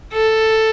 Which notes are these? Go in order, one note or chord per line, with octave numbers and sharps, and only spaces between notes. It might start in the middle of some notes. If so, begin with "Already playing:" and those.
A4